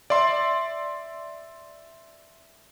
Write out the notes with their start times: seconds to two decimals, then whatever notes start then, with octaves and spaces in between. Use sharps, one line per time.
0.10 D5 E5 C6